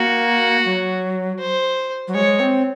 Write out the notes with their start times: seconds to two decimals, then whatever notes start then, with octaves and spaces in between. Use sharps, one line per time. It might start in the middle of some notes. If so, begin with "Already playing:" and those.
Already playing: A#3 F#4
0.65 F#3
1.40 C5
2.08 F#3
2.15 G#3 C#5
2.40 C4